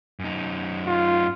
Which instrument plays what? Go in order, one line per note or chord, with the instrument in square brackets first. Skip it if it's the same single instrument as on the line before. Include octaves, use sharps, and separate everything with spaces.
[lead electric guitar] F#2 D#4
[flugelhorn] F4